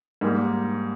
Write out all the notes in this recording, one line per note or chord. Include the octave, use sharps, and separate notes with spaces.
G#2 G3 A#3